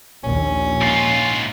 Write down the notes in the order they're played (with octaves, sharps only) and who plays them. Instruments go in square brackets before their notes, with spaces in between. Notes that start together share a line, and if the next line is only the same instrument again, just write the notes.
[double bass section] A#1 D#2 [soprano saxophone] C#4
[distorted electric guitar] G#2 F4